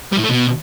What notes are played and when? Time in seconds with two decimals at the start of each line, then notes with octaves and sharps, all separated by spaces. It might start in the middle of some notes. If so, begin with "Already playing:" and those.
0.13 G3
0.18 A2
0.24 A3
0.30 B2